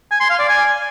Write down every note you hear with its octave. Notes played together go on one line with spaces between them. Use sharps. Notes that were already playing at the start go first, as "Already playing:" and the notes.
G#5
C6
F5
D5
G#5